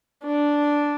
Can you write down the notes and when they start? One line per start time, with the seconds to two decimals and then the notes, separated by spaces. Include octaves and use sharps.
0.23 D4